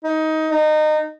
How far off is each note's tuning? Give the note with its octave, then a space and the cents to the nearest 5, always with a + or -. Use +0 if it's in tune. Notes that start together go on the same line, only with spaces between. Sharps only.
D#4 +20
D#4 -25